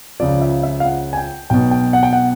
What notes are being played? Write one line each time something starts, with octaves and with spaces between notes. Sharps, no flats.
C#2 C#3 F3 D5
E5
E5
F5
F#5
G#5
G5
B1 B2 G5
G5
F#5
G5
F#5